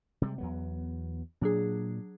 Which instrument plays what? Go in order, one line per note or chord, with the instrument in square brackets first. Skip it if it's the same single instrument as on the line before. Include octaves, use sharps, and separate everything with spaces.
[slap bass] C3 G3 G#3
E2 F#3 B3
[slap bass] A#2 [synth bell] F#3 D4 G#4